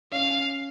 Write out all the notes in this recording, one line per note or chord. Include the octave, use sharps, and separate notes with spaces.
C#4 F5